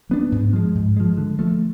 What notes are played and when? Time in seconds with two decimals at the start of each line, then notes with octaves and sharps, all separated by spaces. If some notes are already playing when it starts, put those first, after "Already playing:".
0.09 F#3 B3 D4
0.32 G#2
0.53 F3 G#3
0.75 G#2
0.97 F3 G#3
1.17 D3
1.39 F3 A3